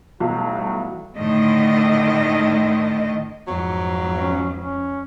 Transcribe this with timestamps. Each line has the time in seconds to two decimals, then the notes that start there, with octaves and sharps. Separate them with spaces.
0.20 B1 A2 E3 F#3 G3
1.17 A2 D3 D#3 D#5
3.47 F2 G#2 F#3
4.18 C#4
4.57 C#4